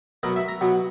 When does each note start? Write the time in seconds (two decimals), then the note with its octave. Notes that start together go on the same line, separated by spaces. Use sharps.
0.23 B2 F#3 B3 A#4
0.36 E5
0.48 A#5
0.61 B2 F#3 B3